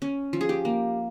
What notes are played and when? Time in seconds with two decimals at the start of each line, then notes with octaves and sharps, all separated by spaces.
0.02 C#4
0.33 F3
0.41 G#4
0.49 G4
0.65 A#3